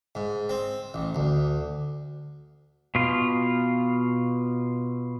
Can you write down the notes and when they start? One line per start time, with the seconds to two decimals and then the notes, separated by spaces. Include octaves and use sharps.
0.15 G#2
0.49 C4
0.94 A1
1.15 D2
2.95 B2 F4